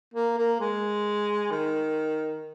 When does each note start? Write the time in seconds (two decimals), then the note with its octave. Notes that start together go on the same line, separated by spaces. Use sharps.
0.14 A#3
0.38 A#3
0.60 G#3
1.51 D#3